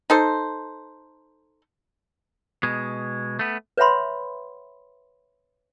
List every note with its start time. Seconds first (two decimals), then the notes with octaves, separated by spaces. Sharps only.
0.10 D#4 A4 C5
2.63 B2 G#3
3.39 A3 B3
3.77 B4 C#5 E5 F#5 B5 C6